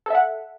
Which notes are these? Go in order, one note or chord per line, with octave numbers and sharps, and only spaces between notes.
A4 E5 F#5